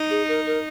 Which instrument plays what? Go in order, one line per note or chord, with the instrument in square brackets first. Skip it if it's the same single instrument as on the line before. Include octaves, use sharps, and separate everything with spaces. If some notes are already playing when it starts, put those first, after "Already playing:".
Already playing: [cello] D#4
[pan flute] G#4
A#4
A#4